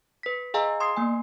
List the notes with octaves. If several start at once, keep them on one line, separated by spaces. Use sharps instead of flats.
B4 B6
G#4 D#5 F5 G#5 A#5 E6
C6 D#6 G#6 C7
A#3 B3 G#5